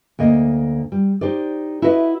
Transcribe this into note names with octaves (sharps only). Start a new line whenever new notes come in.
D2 A#3 D#5
G3
D#4 G4 C5 D5
E4 F#4 B4 D#5 E5